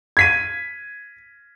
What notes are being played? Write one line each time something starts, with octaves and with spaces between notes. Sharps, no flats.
G#6 B6 D#7